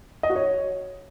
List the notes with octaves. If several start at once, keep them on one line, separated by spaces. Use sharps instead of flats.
D#5
F#4
C#5